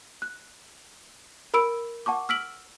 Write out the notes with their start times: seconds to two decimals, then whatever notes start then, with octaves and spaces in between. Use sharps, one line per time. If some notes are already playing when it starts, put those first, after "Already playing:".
0.22 F#6
1.54 A#4 B5 E6 D7
2.06 F#5 A5 C#6 D6
2.29 E6 F6 B6 D7 F#7